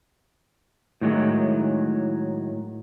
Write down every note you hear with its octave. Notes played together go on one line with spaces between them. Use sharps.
A2 D#3 F#3 G#3